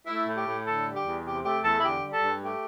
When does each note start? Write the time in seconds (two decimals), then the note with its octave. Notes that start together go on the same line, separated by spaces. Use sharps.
0.07 A3 E4
0.27 A2
0.36 G4
0.46 A2
0.66 D3 A4
0.85 G3
0.95 G4
1.04 E2
1.24 C3 G4
1.44 A3 G4
1.63 E2 A4
1.79 E4
1.83 D3 G4
2.03 G3
2.12 A4
2.22 G2
2.42 A3 G4